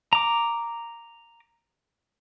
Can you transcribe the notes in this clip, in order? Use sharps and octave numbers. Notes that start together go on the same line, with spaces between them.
A#5 D6